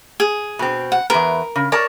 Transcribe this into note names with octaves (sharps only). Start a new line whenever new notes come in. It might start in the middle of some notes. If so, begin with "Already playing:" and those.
G#4
B2 C4
F#5
E2 G#2 A#4 B4
C#3
A#4 C#5 D5 A5